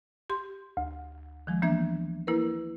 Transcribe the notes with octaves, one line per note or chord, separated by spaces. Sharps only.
G4 C6
D2
D#3 F3 G#3
E3 A#3 B3 D4 E5 G#6
A#3 E4 A#4 B4